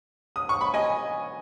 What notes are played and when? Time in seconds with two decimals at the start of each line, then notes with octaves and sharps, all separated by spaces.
0.36 D#6
0.49 C#6
0.61 B5
0.74 D#5 G#5